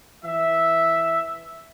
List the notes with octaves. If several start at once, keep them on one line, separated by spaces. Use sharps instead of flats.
E3 E5